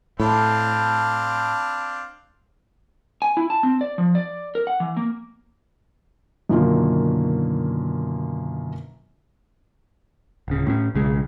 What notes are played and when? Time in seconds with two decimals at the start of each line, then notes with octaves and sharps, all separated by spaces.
0.20 A2 C4 D4 F5 A5 B5
3.22 G#5
3.37 E4
3.50 A5
3.63 C4
3.81 D5
3.98 F3
4.15 D5
4.55 A#4
4.67 F#5
4.80 E3
4.97 A#3
6.49 F#2 B2 D3 D#3 A#3 F4
10.48 D1 C#3
10.67 A2 C4 C#4
10.95 B1 C#3 G#3